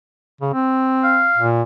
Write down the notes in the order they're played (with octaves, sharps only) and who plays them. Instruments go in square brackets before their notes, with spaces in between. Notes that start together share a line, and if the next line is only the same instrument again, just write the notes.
[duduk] C#3
C4
[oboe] F5
[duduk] A#2